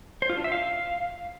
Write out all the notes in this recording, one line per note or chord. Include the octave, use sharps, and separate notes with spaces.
C5
F4
D4
E5
F5